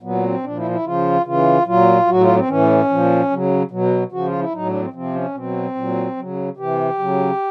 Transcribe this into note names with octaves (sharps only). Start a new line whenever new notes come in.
A#2 F#3 B3
C4
A#2 F3 D4
E4
E4
C#3 F3 F4
C#3 E3 F4
A#2 F#3 F4
A2 F#3 F#4
F4
C4
A2 E3 C#4
A#2 F3
C#3 F#3
B2 F#3
C#3 F3 F#4
F4
E4
A2 F#3 D#4
D4
C4
C3 F3 C4
C#4
B2 F#3 C4
A#2 F#3
F#3
C#3
C3 E3 G4
C#3 F#3